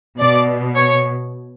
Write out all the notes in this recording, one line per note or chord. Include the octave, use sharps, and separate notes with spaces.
B2 D5
C#5